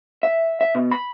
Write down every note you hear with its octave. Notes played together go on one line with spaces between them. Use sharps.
E5
E5
B2
B5